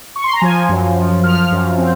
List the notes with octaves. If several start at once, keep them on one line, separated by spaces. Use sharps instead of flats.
C#6
C6
A#5
F3 G#5
F#2
F3
F3 F6
F#2
C4